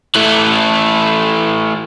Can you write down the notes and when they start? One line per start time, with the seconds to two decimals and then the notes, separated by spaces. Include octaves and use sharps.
0.16 E3 A3